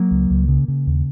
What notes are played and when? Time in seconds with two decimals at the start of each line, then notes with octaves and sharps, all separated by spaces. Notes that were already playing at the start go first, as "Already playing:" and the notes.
Already playing: F#3 A#3
0.11 C#2
0.30 C#2
0.48 C#3
0.68 C#3
0.87 D#2